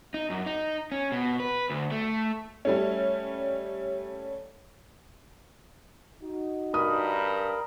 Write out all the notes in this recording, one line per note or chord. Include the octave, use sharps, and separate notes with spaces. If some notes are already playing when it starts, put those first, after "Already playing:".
D#4
F#2
D#4
C#4
B2
B4
D2
A3
G3 A3 C#4
D#4 F#4
G2 A#4 B5 D#6